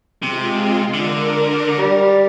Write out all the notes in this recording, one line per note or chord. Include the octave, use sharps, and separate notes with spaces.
C3 G#3 F4
D3 A#4
G3